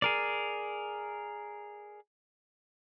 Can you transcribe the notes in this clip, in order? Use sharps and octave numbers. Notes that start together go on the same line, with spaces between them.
G#4 A#4 D5